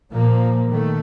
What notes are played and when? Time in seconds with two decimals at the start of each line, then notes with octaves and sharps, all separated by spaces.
0.13 A#2 F3 A#3
0.70 D#3 A3